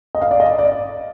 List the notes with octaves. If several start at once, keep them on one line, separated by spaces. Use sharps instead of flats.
D#5
F5
D5
D#5
D5